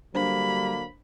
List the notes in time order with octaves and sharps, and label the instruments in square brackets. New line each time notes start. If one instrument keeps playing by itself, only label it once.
[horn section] D3 F#3 A#3 [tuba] G3 [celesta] D4 C5 [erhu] B5